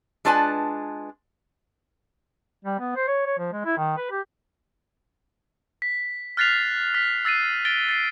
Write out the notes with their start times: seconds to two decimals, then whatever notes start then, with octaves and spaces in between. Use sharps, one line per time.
0.25 G#3 D4 F4 B4 G#5 A5
2.65 G3
2.79 B3
2.96 C5
3.08 C#5
3.26 C#5
3.38 F3
3.53 G#3
3.65 E4
3.78 D#3
3.97 B4
4.11 G4
5.82 B6
6.37 F6 F#6 A6 B6 C7 F7
6.94 F6 B6
7.25 E6 A6 C7 D#7
7.65 A6 D7 G7
7.89 A6 C7